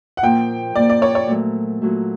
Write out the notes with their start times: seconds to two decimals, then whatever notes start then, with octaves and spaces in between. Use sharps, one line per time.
0.17 F#5
0.23 A#2 F3 A#3 G5
0.76 A#2 F3 A#3 D5
0.90 D5
1.02 C#5
1.15 C#5
1.27 A#2 F#3 A3
1.82 A#2 F#3 A3